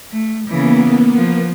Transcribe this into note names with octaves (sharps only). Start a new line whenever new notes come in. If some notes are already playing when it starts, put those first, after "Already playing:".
A3
C#3 E3 A#3 B3
F3